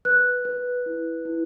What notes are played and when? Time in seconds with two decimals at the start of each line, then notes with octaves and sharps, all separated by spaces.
0.05 B4 F#6
0.45 B4
0.86 E4
1.25 E4